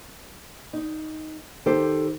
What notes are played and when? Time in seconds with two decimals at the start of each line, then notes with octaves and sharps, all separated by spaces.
0.73 D#4
1.66 D#3 G4 A4 C5